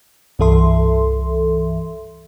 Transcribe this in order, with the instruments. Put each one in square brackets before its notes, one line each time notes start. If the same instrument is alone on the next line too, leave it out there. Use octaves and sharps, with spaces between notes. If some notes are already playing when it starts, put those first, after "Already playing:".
[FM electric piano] C2 G2 E3 A4 E5 C6